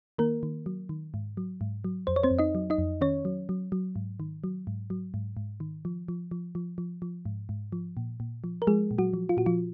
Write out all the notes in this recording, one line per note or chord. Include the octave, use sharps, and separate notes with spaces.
D#3 A#3 A#4
D#3
F#3
D#3
G#2
F#3
G#2
F#3
F2 C5
C#5
C4 C5
F2
D#4 D#5
F#3
D#4 D#5
F2
D#3 C#4 C#5
F#3
F#3
F#3
G#2
D#3
F#3
G#2
F#3
G#2
G#2
D#3
F3
F3
F3
F3
F3
F3
G#2
G#2
F3
A#2
A#2
F3
A#4
F3 G#3 G#4
A#2
F#3 F#4
F3
F4
A#2 F#4
F3 F4